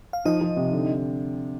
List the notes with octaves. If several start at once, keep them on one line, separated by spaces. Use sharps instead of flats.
F5
F3 D#4 D#5
F3
C3
D3